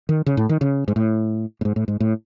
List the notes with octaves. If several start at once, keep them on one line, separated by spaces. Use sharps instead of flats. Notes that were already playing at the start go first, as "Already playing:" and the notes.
D#3
C#3
A2
D#3
C#3
G#2
A2
A2
G#2
A2
G#2
A2